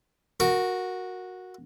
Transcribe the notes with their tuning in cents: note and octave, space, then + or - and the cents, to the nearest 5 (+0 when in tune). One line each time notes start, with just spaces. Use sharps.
F#4 -10 A#4 +0